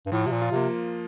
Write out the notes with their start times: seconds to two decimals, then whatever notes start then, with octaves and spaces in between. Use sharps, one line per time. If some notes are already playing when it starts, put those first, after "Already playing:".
0.06 G2
0.12 A2 F3
0.26 C3 F3
0.32 A#2
0.42 F4
0.51 C3 A#3